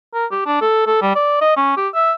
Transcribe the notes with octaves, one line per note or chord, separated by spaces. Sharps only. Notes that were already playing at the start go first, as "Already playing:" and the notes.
A#4
G4
D4
A4
A4
G3
D5
D#5
C#4
G4
E5